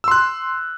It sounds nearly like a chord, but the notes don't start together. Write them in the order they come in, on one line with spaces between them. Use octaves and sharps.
E6 C6 F#6